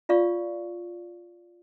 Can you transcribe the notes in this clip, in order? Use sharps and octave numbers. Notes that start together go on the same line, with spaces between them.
F4 D5 F5 C#6